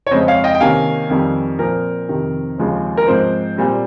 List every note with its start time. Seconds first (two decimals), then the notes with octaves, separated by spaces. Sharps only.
0.07 C#5
0.11 F2 C#3 G#3 C5 D#5
0.27 C#5 F5
0.44 D#5 G5
0.55 G5
0.60 C3 D#3 A#3 C#4 F5 G#5
1.10 F2 D#3 G3
1.59 A#2 F3 C4 A#4
2.09 F2 C3 D#3
2.58 D#2 C#3 F3 G#3 C4
2.97 A#4
3.07 G#2 F3 C4 C5
3.56 A#2 G3 C4